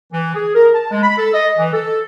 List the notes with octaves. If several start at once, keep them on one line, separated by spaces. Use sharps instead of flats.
E3
G#4
A#4
A5
G#3
B5
A4
D#5
E3
A4